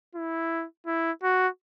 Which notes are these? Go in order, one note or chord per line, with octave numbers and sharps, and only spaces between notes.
E4
E4
F#4